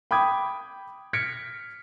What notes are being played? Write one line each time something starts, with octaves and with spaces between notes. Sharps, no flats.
G5 B5 D6 D#6 G#6
F6 G#6 A#6 B6 C#7 D7